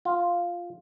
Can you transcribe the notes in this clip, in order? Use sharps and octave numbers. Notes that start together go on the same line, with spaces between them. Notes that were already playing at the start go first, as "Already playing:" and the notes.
F4